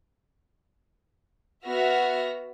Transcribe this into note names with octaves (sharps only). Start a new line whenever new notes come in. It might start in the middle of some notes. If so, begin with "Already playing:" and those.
B3 F#4 E5 F6 A#6